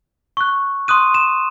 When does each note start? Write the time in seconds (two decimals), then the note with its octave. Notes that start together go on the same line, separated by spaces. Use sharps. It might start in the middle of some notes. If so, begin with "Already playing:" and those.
0.37 C#6 F#6
0.88 C6 D#6 F#6 D#7
1.14 E7